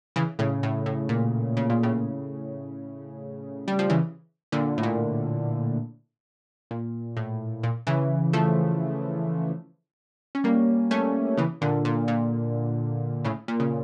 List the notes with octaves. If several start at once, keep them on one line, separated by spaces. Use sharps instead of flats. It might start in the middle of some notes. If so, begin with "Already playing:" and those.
C#3 E3
A2 C#3
A2
A2
A#2
C#3
A#2
A2 C#3
G3
F3
C#3 E3
A#2 D3
A2
A#2
A#2
A2
A#2
C#3 E3
F3 A3
C#4
G3 A#3
A3 C#4
C#3 E3
A#2 D3
A#2
A#2
A2 C#3
A#2
C#3